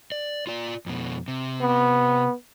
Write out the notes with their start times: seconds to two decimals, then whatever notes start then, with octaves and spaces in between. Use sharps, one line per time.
0.12 D5
0.47 F4 D5
0.86 F2 B2
1.28 C3
1.61 B3